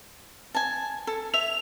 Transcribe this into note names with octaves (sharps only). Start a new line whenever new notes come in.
G#5 A5
A4
E5 F7